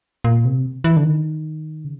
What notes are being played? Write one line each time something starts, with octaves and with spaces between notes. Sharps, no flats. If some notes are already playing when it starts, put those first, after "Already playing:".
A#2
C3
E3
D3
D#3
C#3